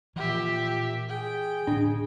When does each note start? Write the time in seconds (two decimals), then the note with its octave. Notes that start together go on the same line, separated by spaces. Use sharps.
0.16 A#2 E3 F3 G4 E5
1.09 G#4 G5
1.67 A2 D3 D4